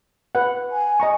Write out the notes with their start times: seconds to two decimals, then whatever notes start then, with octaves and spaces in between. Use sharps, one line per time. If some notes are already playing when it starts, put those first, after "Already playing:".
0.35 B4 F#5
0.71 G#5
1.00 D#5 A#5 C#6